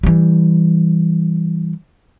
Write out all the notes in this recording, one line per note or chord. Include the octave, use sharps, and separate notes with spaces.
E3 G3